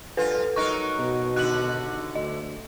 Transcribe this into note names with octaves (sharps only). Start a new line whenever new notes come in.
G2 F3 F4 A4 B4
F#3 D#4 A#4 C#6 F#6
B2
D#2 D3 F#4 F#6 F#7
D2 D#5